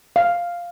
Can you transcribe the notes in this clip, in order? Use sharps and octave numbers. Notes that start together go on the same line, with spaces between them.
F5